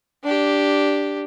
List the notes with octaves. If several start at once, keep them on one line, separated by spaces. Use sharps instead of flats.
D4 G4